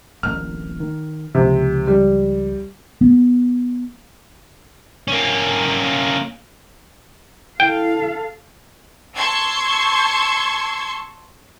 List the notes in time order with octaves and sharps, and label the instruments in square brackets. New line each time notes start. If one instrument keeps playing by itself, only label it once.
[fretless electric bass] D1 A1 A#3 [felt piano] F6
[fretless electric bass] D#3
[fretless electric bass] C#2 F3 [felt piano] C3
[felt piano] G3
[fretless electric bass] B3
[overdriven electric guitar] A#3 C#4
[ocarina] E4 [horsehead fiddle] A4 F5 [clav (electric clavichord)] G5
[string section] A5 C6 C#6 E6 G#6